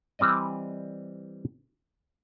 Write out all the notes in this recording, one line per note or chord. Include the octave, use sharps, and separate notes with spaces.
E3 G3 C4 D5 D#5